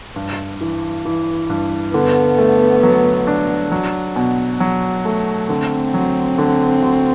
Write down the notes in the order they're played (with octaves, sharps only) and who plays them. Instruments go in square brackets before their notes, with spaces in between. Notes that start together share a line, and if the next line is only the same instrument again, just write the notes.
[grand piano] G2
E3
E3
G2
[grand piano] D3 [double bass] B3
[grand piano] A3
F#3
D4
F#3
B2
F#3
A3
[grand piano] D3 [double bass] C4
[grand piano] F#3
D3
D2